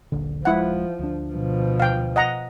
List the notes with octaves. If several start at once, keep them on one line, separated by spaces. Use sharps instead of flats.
D#1 A#1 D3
D#1 F3 G#3 E4 F#5
D2 D4
B2 F3
F5 G5
D#5 F#5 A#5